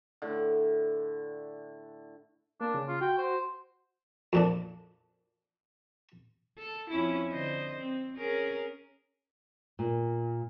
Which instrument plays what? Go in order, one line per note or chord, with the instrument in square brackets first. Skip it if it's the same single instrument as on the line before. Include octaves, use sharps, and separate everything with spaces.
[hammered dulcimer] A2 D3
[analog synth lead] A#3 [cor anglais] D4
[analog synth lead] C#3
[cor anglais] F4
[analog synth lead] F#4 [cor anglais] G5
[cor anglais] C5
[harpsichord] F2 A#2 D4
[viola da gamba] A4
F2 C#4 E4
D3 C5 D#5
C4
C#4 G#4 A#4
[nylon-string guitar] A#2